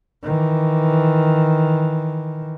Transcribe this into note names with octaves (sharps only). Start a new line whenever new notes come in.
D#3 E3